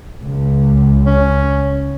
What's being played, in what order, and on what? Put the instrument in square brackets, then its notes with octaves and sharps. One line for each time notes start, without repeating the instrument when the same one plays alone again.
[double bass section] C#2
[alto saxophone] C#4